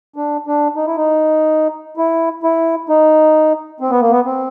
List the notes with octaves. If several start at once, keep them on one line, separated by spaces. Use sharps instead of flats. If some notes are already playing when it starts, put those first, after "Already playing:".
D4
D4
D#4
E4
D#4
E4
E4
D#4
C4
B3
A#3
B3
C4